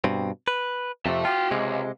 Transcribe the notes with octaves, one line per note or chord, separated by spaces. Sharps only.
G2 B2 C4
B4
F2 C3 E5 A5
F4 F#4 G5
C#2 C3 G#3